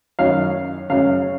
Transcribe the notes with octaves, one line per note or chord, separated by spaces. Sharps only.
F#2 D#3 F#3 C#4 F5
F#2 C#3 F#3 C#4 F5